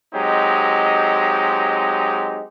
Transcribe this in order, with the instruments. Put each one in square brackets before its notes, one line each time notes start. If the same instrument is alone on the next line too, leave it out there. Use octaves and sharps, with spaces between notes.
[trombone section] F#3 G#3 C4 D#4 G4